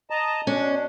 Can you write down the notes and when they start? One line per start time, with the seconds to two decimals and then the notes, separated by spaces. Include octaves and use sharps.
0.10 D#5 A5 A#5
0.47 B2 C#4 D4